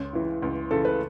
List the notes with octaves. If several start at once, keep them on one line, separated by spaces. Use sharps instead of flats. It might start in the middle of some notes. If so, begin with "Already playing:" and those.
Already playing: C#2 C#5
C#3 E3
C#2
C#3 E3 A4
B4